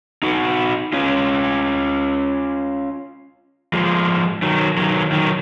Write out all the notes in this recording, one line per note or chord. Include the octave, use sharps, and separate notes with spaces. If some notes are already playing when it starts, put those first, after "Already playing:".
D#4 F#4
C#4 F4
F3 G#3
D#3 F#3
D#3 F#3
D#3 F#3